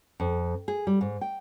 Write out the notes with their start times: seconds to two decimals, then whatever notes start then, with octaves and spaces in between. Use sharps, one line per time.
0.20 F2
0.68 G#4
0.87 G3
1.01 G#2
1.21 G5